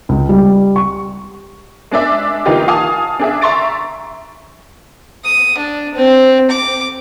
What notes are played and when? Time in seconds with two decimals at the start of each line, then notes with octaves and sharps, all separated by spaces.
0.09 C#2
0.29 G3
0.76 C#6
1.91 G#3 D4 D5 E5
2.46 E3 A#3 D#4 F4 G4
2.68 F5 G#5 A5 D#6
3.19 D4 G#4 E5
3.41 E5 A#5 C6 C#6 A6 D7
5.25 D#6
5.58 D4
5.95 C4
6.50 D6